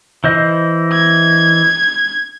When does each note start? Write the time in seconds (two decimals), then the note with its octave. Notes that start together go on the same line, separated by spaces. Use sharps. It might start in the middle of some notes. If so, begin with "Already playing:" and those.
0.24 E3 C5 D#5
0.93 G#6